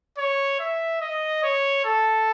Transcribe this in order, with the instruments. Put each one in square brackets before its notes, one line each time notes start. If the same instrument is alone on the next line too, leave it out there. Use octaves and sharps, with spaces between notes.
[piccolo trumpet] C#5
E5
D#5
C#5
A4